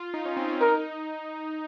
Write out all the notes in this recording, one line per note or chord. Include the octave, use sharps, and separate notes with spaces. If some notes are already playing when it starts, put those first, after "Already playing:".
Already playing: F4
D#4
C#4
C4
C#4
D#4 A#4